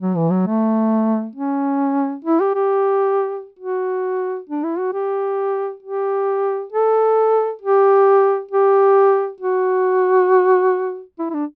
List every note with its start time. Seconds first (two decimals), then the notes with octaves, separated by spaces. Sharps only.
0.01 F#3
0.16 E3
0.31 F#3
0.47 A3
1.36 C#4
2.25 E4
2.40 G4
2.54 G4
3.59 F#4
4.49 D4
4.64 E4
4.78 F#4
4.93 G4
5.82 G4
6.72 A4
7.62 G4
8.51 G4
9.40 F#4
11.19 E4
11.30 E4
11.34 D4